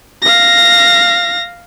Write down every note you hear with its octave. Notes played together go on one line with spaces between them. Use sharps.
F5 A#6